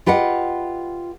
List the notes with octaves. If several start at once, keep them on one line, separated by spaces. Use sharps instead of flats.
F4 G4 B4 D#5 F#5